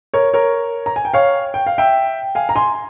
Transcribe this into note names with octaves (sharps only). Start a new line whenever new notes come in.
A#4 C#5
A#4 C#5
A#5
G#5
G5
C#5 F5
G5
F5
E5 G5
F5 G#5
A#5
G#5 C6